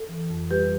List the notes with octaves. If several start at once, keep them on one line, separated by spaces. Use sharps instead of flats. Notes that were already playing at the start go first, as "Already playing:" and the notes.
Already playing: A4
E3
F2
G3 G4 B4